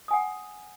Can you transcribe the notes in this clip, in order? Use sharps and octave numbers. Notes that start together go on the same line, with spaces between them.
F#5 G#5 D#6